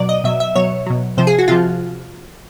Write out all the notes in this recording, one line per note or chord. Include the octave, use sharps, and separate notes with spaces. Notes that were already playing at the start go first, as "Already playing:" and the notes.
Already playing: B2 F#3 D5
D#5
B2 F#3 E5
E5
B2 F#3 C#5
B2 F#3
C3 F3 C5
G#4
F#4
C3 F3 F4